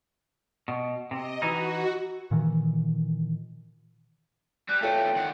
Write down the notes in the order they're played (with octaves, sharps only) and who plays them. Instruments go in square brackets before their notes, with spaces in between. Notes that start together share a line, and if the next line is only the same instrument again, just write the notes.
[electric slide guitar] B2
[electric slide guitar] C3 [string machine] D#5
[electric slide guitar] E3 D#4 [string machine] F#4
[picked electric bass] A#2 D#3 E3
[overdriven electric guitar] G3 [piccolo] F#6
[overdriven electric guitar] E2 A3 [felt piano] F4 A4 C#5 [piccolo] G5
[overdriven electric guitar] D#3 F#5